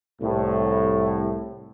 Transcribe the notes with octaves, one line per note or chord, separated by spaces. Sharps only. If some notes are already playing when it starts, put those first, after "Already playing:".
C2 A2